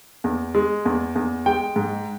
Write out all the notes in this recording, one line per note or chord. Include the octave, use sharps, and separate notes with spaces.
E2
G#3
E2
E2
G#3 G5
G#2